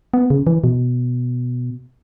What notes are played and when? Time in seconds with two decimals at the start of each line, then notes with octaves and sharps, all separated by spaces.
0.14 B3
0.30 C#3
0.47 E3
0.64 B2